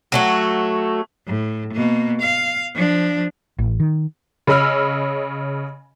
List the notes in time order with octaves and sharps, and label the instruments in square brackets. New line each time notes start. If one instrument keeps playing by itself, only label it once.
[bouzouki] F#3 A3 F#4
[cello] A2
B2 A#3
F5
F3 D4
[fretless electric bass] A1
D#3
[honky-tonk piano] C#3 C#4 D#5 B5 E6 F6